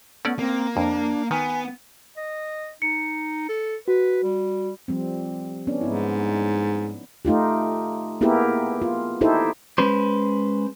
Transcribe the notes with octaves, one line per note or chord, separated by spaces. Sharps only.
A3 B3 C#4 D5
A#3 C4
F2 D4
D#3 B3 G#5
D#5
D#4 C#7
A4
F#4 B4
G3
F3 G3 C4
B3 C#4 D4
G#2 B3 D#4 E4
A3 D#4 F4 G4
A#3 B3 E4 G4 G#4 A#4
F4
D#4 E4 G4 A4 C5
G#3 C#4 B4 C5